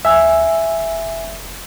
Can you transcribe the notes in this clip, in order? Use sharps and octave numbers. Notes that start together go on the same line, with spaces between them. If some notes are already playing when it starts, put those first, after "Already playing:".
D2 E5 G#5
F1